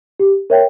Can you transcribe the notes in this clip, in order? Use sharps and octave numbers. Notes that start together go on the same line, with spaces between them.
G4
A#4 C#5 E5 G5